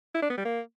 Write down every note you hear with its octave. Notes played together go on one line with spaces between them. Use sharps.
E4
D4
B3
G3
A#3